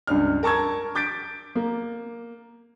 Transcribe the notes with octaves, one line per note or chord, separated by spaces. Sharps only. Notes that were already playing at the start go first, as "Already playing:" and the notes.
C#2 G2 D4 F6
A#4 A5 C#6 E6 G#6
D6 G6 A6 B6 D7
A#3